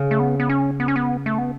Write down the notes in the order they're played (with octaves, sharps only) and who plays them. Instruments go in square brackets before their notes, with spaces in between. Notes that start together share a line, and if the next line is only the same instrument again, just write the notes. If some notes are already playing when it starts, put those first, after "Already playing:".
Already playing: [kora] C#3
[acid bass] A3
B3
B3
C#4
B3
C#4
B3
A3
B3